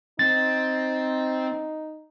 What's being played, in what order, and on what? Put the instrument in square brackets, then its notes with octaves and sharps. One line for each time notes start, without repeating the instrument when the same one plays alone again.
[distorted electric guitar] C4 [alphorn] D#4 [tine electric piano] A6